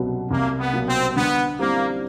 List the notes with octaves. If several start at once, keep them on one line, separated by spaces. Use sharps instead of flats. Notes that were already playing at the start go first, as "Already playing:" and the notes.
Already playing: C2 B2 F#3 B3
C2 A#3
B3
B2 F#3 A#3
C4
D3 B3
G3 A#3 C4 E4